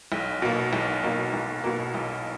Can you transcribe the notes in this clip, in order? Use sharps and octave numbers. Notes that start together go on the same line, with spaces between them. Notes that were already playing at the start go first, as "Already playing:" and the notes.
B1
B2 A#3
B1
B2 A#3
B1
B2 A#3
B1